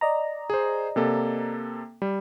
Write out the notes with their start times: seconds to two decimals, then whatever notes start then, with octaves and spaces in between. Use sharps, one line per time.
0.01 D5 D#5 A#5
0.50 G#4 C5
0.96 C3 A#3 A4
2.02 G3